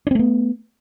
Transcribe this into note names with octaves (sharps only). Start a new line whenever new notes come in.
A3 B3 C4 D4